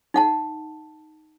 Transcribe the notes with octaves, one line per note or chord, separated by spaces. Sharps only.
D#4 F#5 A5